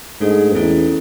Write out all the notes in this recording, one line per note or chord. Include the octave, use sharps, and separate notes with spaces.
G#2 A3 D4 A4
E2 C#4 E4 A4